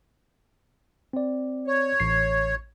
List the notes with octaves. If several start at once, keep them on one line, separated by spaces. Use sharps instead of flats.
C4 D5
C#5
A1 C7